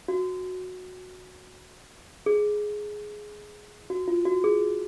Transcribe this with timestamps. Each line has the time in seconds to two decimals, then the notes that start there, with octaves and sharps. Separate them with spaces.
0.08 F#4
2.26 G#4
3.90 F#4
4.08 F4
4.25 F#4
4.44 G#4